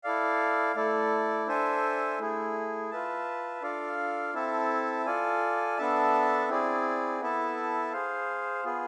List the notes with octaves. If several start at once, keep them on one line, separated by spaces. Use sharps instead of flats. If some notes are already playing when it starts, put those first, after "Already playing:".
E4 A4 D5 F5
A3 E4 A4 D5
D4 A4 C5 E5 G#5
A3 E4 G#4
F4 B4 E5 A5
D4 F4 A4 D5 F5
C4 E4 A4 E5 A5
F4 A4 D5 G#5
B3 D4 A4 E5 A5
C4 E4 G#4 D5
B3 E4 A4 E5 A5
G#4 C5 F5
B3 F4 G#4